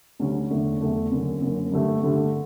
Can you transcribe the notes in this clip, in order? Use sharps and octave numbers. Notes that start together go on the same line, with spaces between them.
D2 D3 G3 C#4
E2 D3 A3 D4
E2 D3 A3 D4
F#1 F#2 D3
F#1 F#2 D3
G2 D3 A3
G2 D3 A3